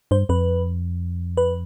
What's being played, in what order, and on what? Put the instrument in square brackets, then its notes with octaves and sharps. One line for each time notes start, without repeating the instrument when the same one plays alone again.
[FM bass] G2 [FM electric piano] C5
[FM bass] F2 [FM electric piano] B4
[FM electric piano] B4